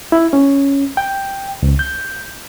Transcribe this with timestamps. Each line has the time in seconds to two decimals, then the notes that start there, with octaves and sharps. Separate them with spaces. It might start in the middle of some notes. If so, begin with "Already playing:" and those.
0.12 E4
0.33 C#4
0.97 G5
1.63 C#2
1.79 G6